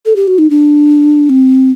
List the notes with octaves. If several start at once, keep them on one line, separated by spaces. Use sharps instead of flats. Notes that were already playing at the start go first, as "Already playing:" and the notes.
A4
G4
F#4
D#4
D4
C4